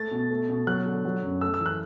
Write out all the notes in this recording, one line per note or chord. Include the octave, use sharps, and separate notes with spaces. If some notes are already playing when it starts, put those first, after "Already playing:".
Already playing: A3 A6
B2
A3
B2
F#3 F#6
D3
F#3
F#2
A3 E6
E6
E3
F#6